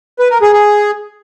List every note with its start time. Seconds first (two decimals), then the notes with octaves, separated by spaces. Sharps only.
0.19 B4
0.30 A#4
0.42 G#4
0.53 G#4